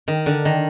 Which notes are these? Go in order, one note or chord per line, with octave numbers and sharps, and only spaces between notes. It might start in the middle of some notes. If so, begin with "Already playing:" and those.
D#3
D3
D#3